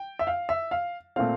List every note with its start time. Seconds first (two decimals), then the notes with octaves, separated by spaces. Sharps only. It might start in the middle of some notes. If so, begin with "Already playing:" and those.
Already playing: G5
0.19 E5
0.27 F5
0.49 E5
0.71 F5
1.16 A#2 A3 C4 F5